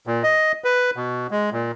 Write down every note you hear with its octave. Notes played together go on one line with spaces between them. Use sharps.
A#2
D#5
B4
B2
G#3
A#2